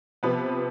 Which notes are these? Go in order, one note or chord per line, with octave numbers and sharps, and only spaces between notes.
C3 F3 B3 B4